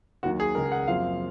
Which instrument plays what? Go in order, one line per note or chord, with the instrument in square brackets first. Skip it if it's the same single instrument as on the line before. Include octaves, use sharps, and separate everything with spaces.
[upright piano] D#2 D#3 F#3 [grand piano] F#4
[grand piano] G#4
[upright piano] C#2 C#3 G#3 [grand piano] A#4
[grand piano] F#5
[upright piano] F#1 F#2 F3 C4 F4 [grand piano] F5